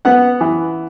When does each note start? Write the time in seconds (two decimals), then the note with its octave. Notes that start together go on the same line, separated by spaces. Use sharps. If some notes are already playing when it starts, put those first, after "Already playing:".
0.05 B3 F#5
0.41 E3